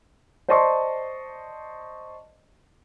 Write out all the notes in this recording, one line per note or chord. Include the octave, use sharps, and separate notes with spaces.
C5 D5 D#5 A5 C6 C#6